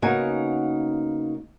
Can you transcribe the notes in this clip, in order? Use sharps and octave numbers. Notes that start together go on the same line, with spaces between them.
C#3 A#3 B3 D#4 F#4 G#5